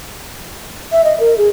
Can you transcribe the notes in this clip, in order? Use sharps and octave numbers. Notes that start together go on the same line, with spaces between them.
E5
D#5
A#4
G#4